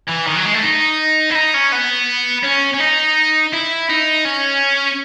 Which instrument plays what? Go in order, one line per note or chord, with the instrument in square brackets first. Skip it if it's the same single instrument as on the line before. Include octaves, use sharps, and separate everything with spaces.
[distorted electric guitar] E3
D#3
F#3
G#3
A3
D#4
E4
D#4
C#4
B3
C#4
C#4
D#4
E4
D#4
C#4